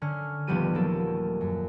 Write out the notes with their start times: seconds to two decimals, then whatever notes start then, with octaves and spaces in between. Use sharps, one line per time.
0.02 D3 C#4 F6
0.47 D#1 F3 G3 B3 G4 D#7
0.75 F#3 A#3 G4 A4
1.41 F#2